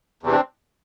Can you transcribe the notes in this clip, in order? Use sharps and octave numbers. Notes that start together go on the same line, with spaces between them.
E2 C3 E3
C4 D4